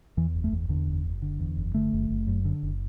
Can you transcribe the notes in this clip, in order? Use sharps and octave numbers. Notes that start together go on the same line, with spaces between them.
E2 E3
F#1
A3
E2
E2 D3
F#1
F#1
D3
E2
F#1
D3 A3
F#1
F#1
F#2
D3
F#1